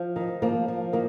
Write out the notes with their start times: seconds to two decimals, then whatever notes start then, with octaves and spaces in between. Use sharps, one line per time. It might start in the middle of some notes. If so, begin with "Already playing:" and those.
Already playing: F3
0.16 D#3
0.42 F3 A#3
0.68 F3
0.93 D#3 A#3